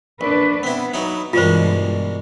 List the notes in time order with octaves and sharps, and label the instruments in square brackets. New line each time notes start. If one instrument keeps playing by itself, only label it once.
[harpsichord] A#1 [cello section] D4 B4
[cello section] B3 [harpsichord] C4 E4
[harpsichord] F#3 D#4 E4
[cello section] G2 E3 G#3 [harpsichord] B2 G3 A#3 [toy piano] F4 C5